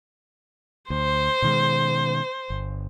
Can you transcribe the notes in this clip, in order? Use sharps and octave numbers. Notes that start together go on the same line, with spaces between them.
D2 C5
B2 D#3 G#3
G1